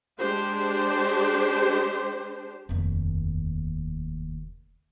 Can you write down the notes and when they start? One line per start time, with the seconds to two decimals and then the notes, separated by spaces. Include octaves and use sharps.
0.19 G#3 D4 G4 C5
2.69 F1 D#2